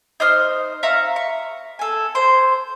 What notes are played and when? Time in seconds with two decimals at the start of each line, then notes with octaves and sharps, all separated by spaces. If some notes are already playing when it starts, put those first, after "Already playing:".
0.20 D#4 C5 D#6 F6
0.83 E5 F5 A#5 C#6
1.16 C#6
1.79 A4 G#5
2.15 C5 C6